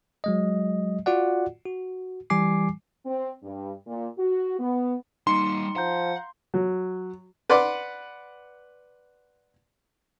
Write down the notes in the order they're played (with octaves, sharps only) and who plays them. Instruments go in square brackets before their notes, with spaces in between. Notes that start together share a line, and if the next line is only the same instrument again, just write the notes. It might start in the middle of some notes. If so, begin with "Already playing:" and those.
[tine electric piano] F#3 G#3 D#5
F4 F#4 D5 F#5
F#4
E3 G3 G#5 D6 C7
[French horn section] C4
G2
A#2
F#4
B3
[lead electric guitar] G3 A#3 [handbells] D#4 C#7 [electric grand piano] C6
[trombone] F3 [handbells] F5 A#5 G6 [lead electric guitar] F#5
[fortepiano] F#3
B4 D5 F#5 C6 D6